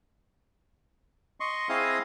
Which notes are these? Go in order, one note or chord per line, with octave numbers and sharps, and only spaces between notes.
D#5 C6 C#6
C4 E4 G#4 D#5 F5 D#6